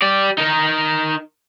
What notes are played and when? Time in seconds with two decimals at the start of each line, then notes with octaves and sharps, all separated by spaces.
0.02 G4 D5
0.38 D#4 A#4